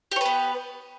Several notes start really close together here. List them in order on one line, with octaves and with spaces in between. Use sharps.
G4 C#5 B4 B3